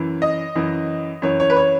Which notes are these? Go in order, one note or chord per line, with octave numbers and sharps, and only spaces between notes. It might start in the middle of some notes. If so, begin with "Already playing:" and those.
Already playing: F#2 E3
D#5
F#2 E3
F#2 E3 C#5
C#5
B4
C#5